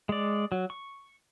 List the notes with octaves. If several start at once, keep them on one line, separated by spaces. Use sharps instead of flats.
G#3 D5
F#3
C#6